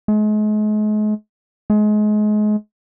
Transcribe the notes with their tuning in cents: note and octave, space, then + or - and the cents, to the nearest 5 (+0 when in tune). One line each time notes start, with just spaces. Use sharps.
G#3 +40
G#3 +30